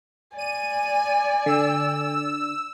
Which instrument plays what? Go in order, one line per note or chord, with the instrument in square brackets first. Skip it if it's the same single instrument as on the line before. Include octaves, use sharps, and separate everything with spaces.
[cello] D5 [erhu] G#5 [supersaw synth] D#7
[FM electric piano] D3 [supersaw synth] E6